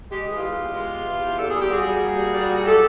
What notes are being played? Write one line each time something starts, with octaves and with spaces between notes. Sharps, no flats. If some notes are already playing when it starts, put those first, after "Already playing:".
G#3 G4
E3 G#4
F4 G4
G#3
E2
G#3
E2
E3
E2
A#2 A4
G#4
G3
G4
G3 F#4 G#4
G3
A#3
G3
G3
A#2
F#3 G4 A4